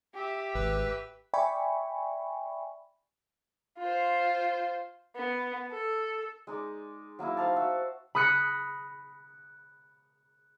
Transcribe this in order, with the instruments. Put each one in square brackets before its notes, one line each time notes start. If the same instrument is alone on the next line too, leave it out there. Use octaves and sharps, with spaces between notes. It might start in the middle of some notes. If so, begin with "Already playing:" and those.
[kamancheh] G4 E5
[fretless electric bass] G#1 [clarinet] B4
[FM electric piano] D5 E5 G5 G#5 B5 C#6
[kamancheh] F4 C5
B3
A4
[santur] G#3 D#4 D5
F#3 A#3 D#4 E4
D#4 C5 F5 A5
F#4 E5
[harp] B5 D#6 F#6 A#6 C#7